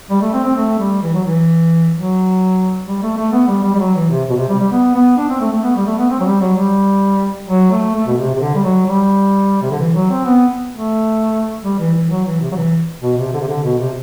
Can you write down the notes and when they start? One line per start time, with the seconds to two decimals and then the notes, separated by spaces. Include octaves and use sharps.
0.10 G3
0.21 A3
0.33 C4
0.44 C4
0.56 A3
0.79 G3
1.02 E3
1.13 F#3
1.24 E3
1.94 F#3
2.87 G3
3.02 A3
3.17 A3
3.33 B3
3.48 G3
3.64 G3
3.74 G3
3.79 F#3
3.95 E3
4.09 C3
4.30 B2
4.37 C3
4.49 G3
4.59 G3
4.71 B3
4.94 B3
5.17 D4
5.29 C4
5.40 A3
5.52 A3
5.63 B3
5.76 G3
5.86 A3
5.98 B3
6.10 C4
6.20 F#3
6.25 G3
6.40 F#3
6.56 G3
7.48 F#3
7.71 A3
7.95 A3
8.07 B2
8.18 C3
8.35 C3
8.40 D3
8.55 G3
8.63 F#3
8.86 G3
9.62 C3
9.70 D3
9.79 E3
9.94 F#3
10.10 C4
10.25 B3
10.71 A3
11.63 G3
11.79 E3
11.94 E3
12.10 F#3
12.25 E3
12.41 C3
12.51 F#3
12.55 E3
13.01 B2
13.18 C3
13.33 D3
13.40 C3
13.48 D3
13.63 B2
13.79 C3